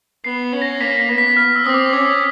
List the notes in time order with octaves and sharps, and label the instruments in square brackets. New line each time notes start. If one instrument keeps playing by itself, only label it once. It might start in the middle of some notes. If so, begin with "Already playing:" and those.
[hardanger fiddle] B3 [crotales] C7
[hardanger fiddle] C#4
[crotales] A#6
[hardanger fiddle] A#3 [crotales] B6
[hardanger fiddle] B3
[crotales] B6
F6
E6
[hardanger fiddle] C4 [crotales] D#6
[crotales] D6
[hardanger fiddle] C#4 [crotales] D6